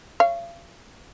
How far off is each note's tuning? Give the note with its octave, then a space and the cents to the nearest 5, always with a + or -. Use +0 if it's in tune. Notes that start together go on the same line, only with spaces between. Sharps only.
C#5 +0 F5 -40